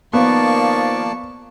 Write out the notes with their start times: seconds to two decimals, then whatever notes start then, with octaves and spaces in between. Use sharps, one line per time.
0.13 D#3 F3 A#3 B3 D5 A5 C#6